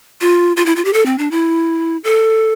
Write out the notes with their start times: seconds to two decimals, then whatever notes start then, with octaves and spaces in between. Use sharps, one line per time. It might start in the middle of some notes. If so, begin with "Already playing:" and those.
0.21 F4
0.57 F4
0.66 E4
0.76 F4
0.85 G4
0.93 A4
1.06 C4
1.18 D4
1.31 E4
2.04 A4